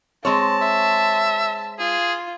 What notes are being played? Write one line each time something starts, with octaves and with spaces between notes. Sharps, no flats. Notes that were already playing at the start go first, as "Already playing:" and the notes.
G#3 C4 C#5 A5
E5
F4 G#4